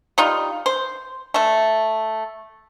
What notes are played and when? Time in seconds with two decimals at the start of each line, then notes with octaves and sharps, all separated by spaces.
0.18 G3 D#4 F4
0.66 C5
1.34 A3 E5